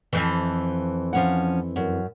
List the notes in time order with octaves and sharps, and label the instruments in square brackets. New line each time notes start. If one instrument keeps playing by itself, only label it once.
[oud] F2 E3
[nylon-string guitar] F3 C#4 F#5
F#2